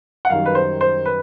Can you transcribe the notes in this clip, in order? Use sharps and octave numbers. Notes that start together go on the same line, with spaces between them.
F#5
F#2 D#3 G3 F5
B4
C5
C5
B4